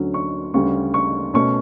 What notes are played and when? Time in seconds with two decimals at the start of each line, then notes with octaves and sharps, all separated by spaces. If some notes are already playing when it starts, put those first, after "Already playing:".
Already playing: D2 D3 F#3 C#4
0.14 C#6
0.54 D2 C#3 G3 C#6
0.94 C#6
1.34 B2 A3 C#4 C#6